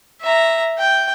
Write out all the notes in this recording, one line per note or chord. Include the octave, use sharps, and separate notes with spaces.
E5 A#5
G5